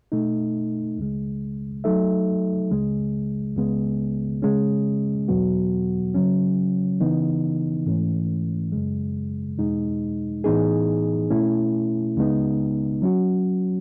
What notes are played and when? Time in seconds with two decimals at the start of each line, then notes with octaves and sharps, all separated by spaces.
0.12 B2 A3 D#4
0.98 C#2 C#3 G#3
1.84 F#3 A3 D#4 A4 E5
2.71 C#2 C#3 G#3
3.56 C#2 C#3 G#3 B3
4.42 C#3 G#3 C#4
5.28 E2 B2 F#3 B3 F#4
6.14 C#3 F#3 C#4
7.00 C#3 E3 B3 D#4
7.86 G#2 E3 A3 C#4
8.72 F#2 C#3 G#3
9.58 E2 B2 G#3 D#4
10.44 A2 E3 B3 D#4 G#4
11.30 B2 A3 C#4 E4
12.17 C#2 C#3 G#3 B3 D#4
13.02 F#3 C#4 F#4